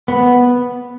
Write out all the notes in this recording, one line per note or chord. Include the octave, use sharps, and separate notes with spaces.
B3